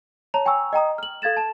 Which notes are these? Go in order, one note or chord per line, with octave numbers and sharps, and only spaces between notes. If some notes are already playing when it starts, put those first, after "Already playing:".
C#5 A5 A#5 F7
G5 G#5 A#5 C#6 E6
D#5 G5 A#5 D#6
F6 F#7
A4 F5 G#6 A6 E7
A5 E7